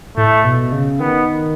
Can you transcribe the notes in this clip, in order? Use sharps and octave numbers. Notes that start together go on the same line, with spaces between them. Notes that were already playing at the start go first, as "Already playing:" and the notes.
A2 A3
B2
C#3
D#3 B3